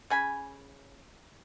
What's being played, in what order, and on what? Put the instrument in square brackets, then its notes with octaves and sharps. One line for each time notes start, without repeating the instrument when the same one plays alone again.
[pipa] C#3 G#5 B5